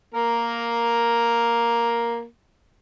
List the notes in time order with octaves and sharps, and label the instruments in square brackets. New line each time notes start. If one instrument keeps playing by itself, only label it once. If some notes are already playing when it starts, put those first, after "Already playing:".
[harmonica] A#3 A#4